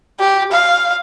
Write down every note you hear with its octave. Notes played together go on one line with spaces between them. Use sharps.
G4
F5